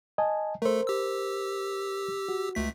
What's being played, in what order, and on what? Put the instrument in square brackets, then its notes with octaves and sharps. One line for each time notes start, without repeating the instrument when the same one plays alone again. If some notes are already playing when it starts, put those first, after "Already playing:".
[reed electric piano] D#5 G#5 A5
[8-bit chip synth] A3 A4 [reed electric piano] A#4 C5
[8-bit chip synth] G4 E6
[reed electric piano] F#4
[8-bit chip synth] C#2 A3 B6